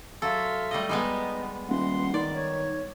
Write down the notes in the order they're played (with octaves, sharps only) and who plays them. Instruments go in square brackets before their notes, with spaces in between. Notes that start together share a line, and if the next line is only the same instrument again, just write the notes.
[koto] F#3 A4 [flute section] E5 F5 C6
[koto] G3 A3 D#5
[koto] G3 G#3 B3 [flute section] D#4
[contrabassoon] D#1 [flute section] F#5 C6
[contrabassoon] D#3 [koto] D5
[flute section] C#5